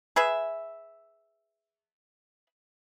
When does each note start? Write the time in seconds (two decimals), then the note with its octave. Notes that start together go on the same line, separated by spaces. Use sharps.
0.16 G#4 B4 E5